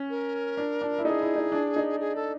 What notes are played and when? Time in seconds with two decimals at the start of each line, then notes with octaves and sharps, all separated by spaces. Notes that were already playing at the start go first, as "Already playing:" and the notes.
Already playing: C#4
0.10 A#4
0.57 D4
0.81 D4
0.98 E4
1.05 D#4 A4
1.10 G#4
1.21 E4
1.36 D#4
1.52 D4
1.76 D#4
2.00 G#4
2.16 A4